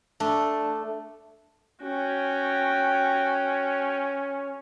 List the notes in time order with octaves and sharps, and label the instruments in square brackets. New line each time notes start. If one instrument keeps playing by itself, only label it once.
[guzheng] A3 D4
[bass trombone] C#4 [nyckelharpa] F#4 G5